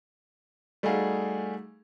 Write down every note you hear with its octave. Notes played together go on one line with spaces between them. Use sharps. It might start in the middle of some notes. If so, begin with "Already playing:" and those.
G3 A3 D#4 F#4 G#4 F5